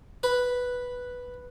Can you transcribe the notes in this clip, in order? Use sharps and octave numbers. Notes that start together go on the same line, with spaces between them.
B4